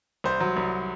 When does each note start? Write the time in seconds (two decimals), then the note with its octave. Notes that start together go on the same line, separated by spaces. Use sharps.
0.24 C2 C5
0.40 F#3
0.57 C2